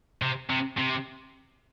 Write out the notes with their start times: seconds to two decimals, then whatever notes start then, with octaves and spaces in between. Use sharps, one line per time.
0.22 C3
0.49 C3
0.77 C3